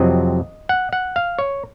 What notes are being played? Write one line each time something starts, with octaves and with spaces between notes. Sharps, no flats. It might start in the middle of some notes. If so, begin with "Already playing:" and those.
Already playing: F2 C3 F#3 C4 D#5
F#5
F#5
F5
C#5